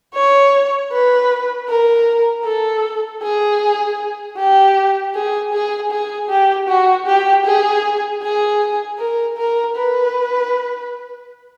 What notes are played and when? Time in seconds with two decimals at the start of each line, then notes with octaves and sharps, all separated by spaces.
0.14 C#5
0.92 B4
1.68 A#4
2.45 A4
3.22 G#4
4.37 G4
5.15 G#4
5.53 G#4
5.91 G#4
6.29 G4
6.68 F#4
7.06 G4
7.45 G#4
8.22 G#4
8.99 A#4
9.37 A#4
9.76 B4